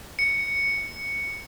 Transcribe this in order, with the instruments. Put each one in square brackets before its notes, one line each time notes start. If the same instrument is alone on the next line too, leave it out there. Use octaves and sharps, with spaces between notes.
[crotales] C#7